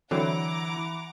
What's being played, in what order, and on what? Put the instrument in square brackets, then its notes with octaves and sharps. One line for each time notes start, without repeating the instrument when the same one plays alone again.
[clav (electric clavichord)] D3 F#3 C4 [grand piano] E3 [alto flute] E4 [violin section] F#5 A#5 D6